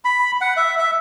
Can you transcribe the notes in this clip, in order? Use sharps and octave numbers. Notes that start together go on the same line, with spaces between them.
B5
F#5
E5
E5